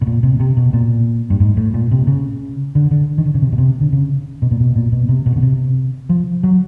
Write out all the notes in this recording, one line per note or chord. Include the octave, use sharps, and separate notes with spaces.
B2
A#2
C3
C3
B2
A#2
G2
G#2
A2
A#2
C3
C#3
D3
D3
D#3
D3
C#3
C3
B2
C3
D3
C#3
B2
A#2
B2
A#2
B2
C3
B2
C#3
C3
F3
F#3